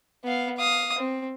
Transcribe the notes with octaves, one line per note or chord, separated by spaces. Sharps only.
B3 F5
F5 D#6
C4